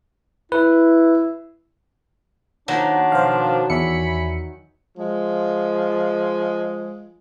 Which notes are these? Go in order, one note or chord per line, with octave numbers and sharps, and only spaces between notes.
E4 B4
D#3 F3 F#3 A#3 D4 D#4
B2 F3 C5 F5
E2 D5 E5 G#5 B5 C#7
F3 G#3